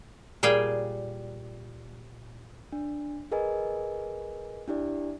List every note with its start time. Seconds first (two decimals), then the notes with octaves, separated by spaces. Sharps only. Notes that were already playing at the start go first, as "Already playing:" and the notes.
0.43 A#2 G3 G#4 F5 G5
2.72 D4
3.32 G#4 A#4 B4 D#5 G#5
4.68 D4 E4 G4 D5